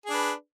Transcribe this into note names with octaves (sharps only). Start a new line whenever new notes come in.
D4 G#4 B4